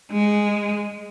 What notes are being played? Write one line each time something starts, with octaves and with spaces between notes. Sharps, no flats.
G#3